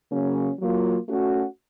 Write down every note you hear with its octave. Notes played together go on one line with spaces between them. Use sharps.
C#3 F#3 A#3 C#4
F#3 A#3 F4
A3 C#4 F#4